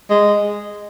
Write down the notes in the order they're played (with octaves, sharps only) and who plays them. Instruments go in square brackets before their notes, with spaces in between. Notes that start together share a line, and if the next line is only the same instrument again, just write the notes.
[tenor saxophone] G#3